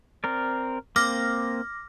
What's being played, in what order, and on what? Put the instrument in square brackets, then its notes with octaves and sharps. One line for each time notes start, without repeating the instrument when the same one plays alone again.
[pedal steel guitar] C4 A#4 D5
[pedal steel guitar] A#3 C4 [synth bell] D6 F6 A#6